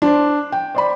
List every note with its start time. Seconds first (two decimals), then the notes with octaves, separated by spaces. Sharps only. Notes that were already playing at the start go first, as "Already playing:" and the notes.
0.02 D4 C5
0.52 G5
0.75 C5 D5 B5